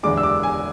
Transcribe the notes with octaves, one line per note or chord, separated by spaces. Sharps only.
F#1 E2 D3 G#3 D4 D6
E6
D6
G#5